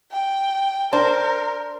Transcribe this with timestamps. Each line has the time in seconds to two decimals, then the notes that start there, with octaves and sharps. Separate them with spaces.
0.12 G5
0.93 D4 A#4 C5